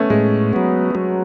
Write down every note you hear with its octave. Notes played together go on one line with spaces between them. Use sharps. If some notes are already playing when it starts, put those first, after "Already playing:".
Already playing: A3 B3 C#4
A2 G#3
F#3 B3
F#3